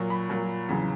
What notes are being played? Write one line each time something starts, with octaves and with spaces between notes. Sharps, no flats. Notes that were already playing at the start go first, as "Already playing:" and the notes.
Already playing: A#2 F#3 C#6
B5
A#2 F#3
E2 C#3 F#3